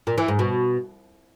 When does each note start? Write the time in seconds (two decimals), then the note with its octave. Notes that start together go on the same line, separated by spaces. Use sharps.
0.07 A#2
0.18 E3
0.28 G#2
0.39 B2